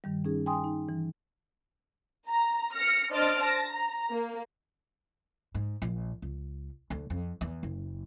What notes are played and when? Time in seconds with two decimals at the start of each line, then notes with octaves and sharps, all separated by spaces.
0.04 G2 D#3 G3
0.25 C#4 D#4 G#4
0.46 G5 G#5 C6 D#6
0.64 D#4
0.89 E3
2.29 A#5
2.74 F6 A#6 C#7
3.12 D4 C5 D#5 F6 A6 D7
3.42 A5 A#6
3.73 A#5
4.11 A#3
5.55 G#2
5.82 A#1
6.22 C#2
6.90 D2
7.10 F2
7.41 E2
7.63 F#1